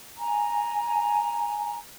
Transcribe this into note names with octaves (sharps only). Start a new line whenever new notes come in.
G#5 A#5